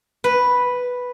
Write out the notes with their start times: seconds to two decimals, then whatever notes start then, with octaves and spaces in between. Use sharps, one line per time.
0.24 B4